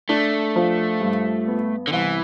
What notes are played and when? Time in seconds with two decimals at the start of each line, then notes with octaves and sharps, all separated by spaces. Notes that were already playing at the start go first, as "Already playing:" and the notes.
0.09 A3 D4
0.56 F3
1.01 G2
1.48 B3
1.87 D3
1.93 C2 E3